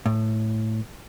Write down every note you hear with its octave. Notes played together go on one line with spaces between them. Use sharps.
A2